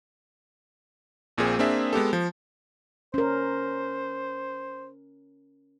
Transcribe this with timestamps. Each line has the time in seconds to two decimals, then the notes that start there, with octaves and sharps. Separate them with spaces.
1.38 A#1 A#2 C4 G#4 C5
1.59 A#3 C4 D4 G#4 E5
1.93 G#3 B3 G4 A4
2.13 F3
3.14 C#4 A#4 C5